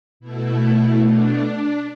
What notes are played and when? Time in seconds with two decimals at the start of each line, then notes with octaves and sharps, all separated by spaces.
0.20 B2 A3 E4
1.03 D4